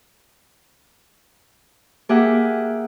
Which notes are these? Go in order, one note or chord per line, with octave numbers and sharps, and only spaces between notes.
A#3 G4 G#4 E5 F#5